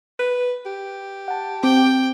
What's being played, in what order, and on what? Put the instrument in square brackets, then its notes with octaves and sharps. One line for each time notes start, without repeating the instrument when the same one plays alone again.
[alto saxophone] B4
G4
[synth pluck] F#5 A5
[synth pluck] C4 D6 [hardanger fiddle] G5